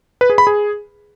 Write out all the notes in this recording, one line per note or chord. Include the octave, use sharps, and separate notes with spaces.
B4
G#4
B5
G#4